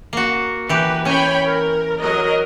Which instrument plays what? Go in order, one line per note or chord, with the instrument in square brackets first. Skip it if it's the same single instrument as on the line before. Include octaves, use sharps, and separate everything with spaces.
[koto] A#3 F#4
[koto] E3 G4 [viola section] B4
[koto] C#4 G#5 [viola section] C#5 G5 B5
[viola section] A#4
F#3 A#4 D#5